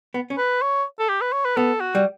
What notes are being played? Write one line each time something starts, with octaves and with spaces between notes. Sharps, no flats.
B3
C#4
B4
C#5
A4
G4
B4
C#5
B4
B3 A4
F#4
G3